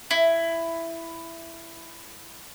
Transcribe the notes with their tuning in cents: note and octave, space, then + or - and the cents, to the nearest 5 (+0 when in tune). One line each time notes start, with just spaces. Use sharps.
E4 +10